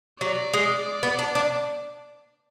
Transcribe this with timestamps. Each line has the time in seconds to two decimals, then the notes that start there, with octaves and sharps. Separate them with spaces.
0.21 F#3 D5
0.53 G#3
1.03 B3
1.19 D4
1.35 D4